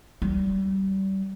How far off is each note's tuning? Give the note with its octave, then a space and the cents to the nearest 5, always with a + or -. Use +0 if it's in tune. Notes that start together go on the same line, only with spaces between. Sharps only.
G3 -30